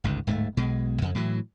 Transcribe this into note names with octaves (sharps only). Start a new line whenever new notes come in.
G1 C#2 G#2
D1 G#2 G3 A3
B1 B2 G#3
F2 C#3
A2 E3 F#3